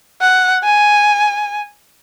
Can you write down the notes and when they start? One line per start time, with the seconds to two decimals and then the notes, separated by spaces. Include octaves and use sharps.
0.21 F#5
0.64 G#5